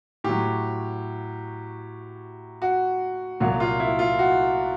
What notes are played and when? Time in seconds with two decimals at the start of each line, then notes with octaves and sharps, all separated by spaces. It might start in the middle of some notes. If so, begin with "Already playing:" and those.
0.24 A2 F#3 G4
2.62 F#4
3.40 C2 A#2 F#3 F#4
3.60 F4
3.80 E4
3.99 F4
4.19 F#4